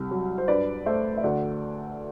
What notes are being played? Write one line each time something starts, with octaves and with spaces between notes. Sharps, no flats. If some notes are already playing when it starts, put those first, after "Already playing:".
Already playing: C2 G3
F#3
C5
G2 B4 D5
A3 C5 E5
E5
D2 D5 F#5